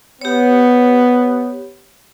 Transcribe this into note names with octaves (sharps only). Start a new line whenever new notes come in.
B3 G4 C#5